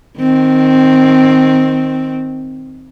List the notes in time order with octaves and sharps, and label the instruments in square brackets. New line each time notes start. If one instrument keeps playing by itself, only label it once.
[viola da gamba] D#3 C4